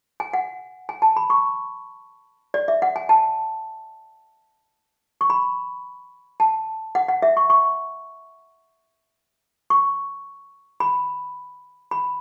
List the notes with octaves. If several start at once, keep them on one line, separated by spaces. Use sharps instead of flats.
G#5
F#5
G#5
A5
B5
C#6
D5
E5
F#5
G#5
A5
C#6
B5
A5
F#5
F#5
E5
C#6
C#6
C#6
B5
B5